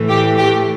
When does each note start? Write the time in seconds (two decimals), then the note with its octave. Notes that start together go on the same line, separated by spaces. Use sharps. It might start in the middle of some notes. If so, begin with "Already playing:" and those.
Already playing: A2 E3 A3
0.08 G4
0.37 G4